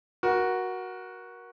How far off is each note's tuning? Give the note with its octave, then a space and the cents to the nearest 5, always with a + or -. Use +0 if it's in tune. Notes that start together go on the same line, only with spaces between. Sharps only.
F#4 +0 A#4 +25